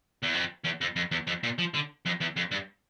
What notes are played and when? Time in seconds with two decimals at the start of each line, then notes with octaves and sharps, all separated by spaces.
0.23 E2
0.34 F2
0.65 E2
0.81 F2
0.96 F2
1.11 E2
1.27 F2
1.43 A#2
1.58 F3
1.74 D3
2.06 F2
2.21 E2
2.37 F2
2.52 G2